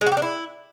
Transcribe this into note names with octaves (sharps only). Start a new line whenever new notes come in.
G#3
F#4
G4
D4
E4